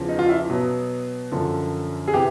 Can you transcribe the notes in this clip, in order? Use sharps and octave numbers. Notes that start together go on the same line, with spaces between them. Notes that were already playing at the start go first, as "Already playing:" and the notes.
Already playing: E2 C#3 F3
D#4
F4
E4
B2 F#3 B3
F#2 D3 F3 A4
G#4
C3 E3 G4